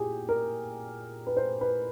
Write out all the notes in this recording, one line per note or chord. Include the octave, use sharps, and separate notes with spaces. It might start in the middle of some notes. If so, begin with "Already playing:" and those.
Already playing: A#2 G4 G#4
A#4
B4
C5
B4